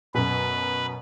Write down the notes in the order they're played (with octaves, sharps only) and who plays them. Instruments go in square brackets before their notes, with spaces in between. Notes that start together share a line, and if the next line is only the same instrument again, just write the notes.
[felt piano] F#2 B2 [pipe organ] B4